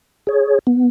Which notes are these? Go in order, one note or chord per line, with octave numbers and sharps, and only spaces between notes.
G#4 C#5
B3